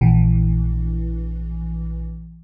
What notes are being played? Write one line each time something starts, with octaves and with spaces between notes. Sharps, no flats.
A#1 E3